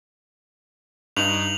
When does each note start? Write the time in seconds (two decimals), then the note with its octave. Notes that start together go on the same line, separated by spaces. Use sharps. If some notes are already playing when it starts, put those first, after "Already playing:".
1.17 G2 D#4 F7 F#7